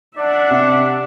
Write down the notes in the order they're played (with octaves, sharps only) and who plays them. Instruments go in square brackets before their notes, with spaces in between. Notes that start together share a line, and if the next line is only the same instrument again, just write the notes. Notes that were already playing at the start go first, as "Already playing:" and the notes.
[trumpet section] D4 [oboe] D5 [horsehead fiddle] E5 F#5
[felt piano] C3